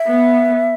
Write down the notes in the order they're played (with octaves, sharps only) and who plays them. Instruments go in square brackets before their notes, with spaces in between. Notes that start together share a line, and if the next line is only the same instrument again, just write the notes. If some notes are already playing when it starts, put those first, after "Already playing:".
Already playing: [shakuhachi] E5
[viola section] B3